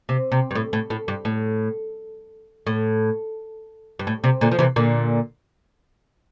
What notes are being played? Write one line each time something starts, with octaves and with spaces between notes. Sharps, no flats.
C3
C3
G2
A2
A2
A2
G2
A2
A2
G2
A2
C3
A#2 D3
F3
C3 E3
A#2 D3